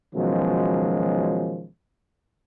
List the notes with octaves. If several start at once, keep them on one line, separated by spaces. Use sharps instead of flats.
B2 D#3 F3 F#3 G#3 C#4